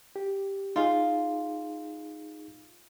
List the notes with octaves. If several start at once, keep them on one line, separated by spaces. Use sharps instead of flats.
G4
D#4 F4 G#4 F5